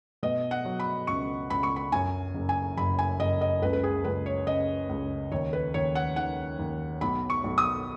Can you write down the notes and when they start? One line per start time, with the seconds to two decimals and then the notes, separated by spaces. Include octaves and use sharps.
0.23 B2 D#5
0.51 F#5
0.65 F#3
0.80 B5
1.07 C#2 C#6
1.50 C#2 B5
1.63 C#6
1.76 B5
1.92 F#2 G#5
2.34 F#1
2.49 G#5
2.77 F#1 B5
2.99 G#5
3.19 F#1 D#5
3.41 D#5
3.62 C#2 B4
3.73 B4
3.83 G#4
4.04 C#2 B4
4.26 C#5
4.47 C#3 D#5
4.89 C#2
5.32 D#2 C#5
5.53 B4
5.74 D#2 C#5
5.95 F#5
6.16 D#3 F#5
6.59 D#2
7.01 B1 B5
7.30 C#6
7.44 B1
7.58 D#6